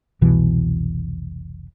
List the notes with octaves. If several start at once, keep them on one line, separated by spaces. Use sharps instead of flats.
F1 C2 B2 E3